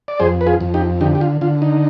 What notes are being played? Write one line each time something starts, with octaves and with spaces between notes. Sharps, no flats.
D5
F2 G#4 C5
B4
F4 G#4
F2
D#4 G4
D3 D#4 G4
G4
F4
D3 F4
D#4